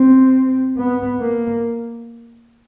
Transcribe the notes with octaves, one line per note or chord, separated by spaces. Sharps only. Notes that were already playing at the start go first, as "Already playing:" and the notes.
Already playing: C4
B3
A#3